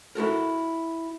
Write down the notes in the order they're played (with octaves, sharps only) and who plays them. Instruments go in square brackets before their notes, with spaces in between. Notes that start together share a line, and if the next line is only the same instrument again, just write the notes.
[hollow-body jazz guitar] E4 F#4 A4 A#4